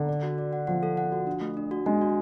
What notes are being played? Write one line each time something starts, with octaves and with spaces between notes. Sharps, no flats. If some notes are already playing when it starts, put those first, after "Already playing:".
Already playing: D3
D5
F#4
D5
F#5
F3 F#5
A4
F#5
F#4
D4
A3
D4
F#4
G#3 D4
F#4